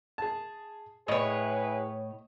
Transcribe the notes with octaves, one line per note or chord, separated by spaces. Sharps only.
G#4 A5
A2 E4 G#4 B4 C#5 D#5